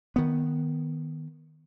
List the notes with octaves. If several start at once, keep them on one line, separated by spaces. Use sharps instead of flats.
D#3 B3